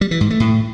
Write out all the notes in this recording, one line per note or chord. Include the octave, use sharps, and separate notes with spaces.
G3
E3
G#2
A3
A2